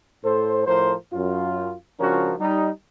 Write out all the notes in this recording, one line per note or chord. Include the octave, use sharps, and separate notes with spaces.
A2 A4 C5
A2 F3 A#4 C5
F#2 F4
C#2 F3 C#4 D4 F#4 A#4
G3 D#4